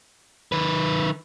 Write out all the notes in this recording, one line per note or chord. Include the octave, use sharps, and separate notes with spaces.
D#3 B4